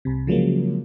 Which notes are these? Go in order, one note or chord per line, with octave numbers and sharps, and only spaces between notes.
C2 C3
C#3 F3 F#3 G#3 A#3